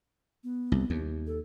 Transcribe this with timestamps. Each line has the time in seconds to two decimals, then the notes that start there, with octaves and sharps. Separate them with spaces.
0.44 B3
0.72 C2
0.90 D#2
1.27 A4